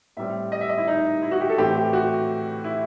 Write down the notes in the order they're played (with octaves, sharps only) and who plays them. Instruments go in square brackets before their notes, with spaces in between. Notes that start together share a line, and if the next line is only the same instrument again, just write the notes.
[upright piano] A2 G3 C4 E5
D#5
E5
D#5
E4
D#4
E4
F#4
G4
A4
A2 E3 A3 C4 G4
G4
F#4
E4